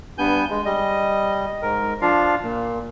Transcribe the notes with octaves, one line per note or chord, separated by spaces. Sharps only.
G2 B3 G#5 G6
G#3
G3 D#5
G#2 A#4
F3 D4 F4 F5
A#2